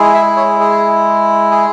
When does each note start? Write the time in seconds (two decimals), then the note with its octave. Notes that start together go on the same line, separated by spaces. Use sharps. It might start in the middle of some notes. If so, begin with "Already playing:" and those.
Already playing: G#3 E4 G#4
0.14 E5
0.37 C#5
0.60 G#4
1.51 G#4